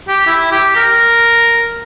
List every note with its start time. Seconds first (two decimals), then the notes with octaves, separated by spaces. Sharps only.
0.08 G4
0.27 E4
0.51 G4
0.76 A#4